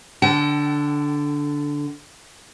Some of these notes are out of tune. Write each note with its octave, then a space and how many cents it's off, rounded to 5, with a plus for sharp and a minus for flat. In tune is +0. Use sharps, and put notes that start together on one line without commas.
D3 -10 A4 +15 G5 -45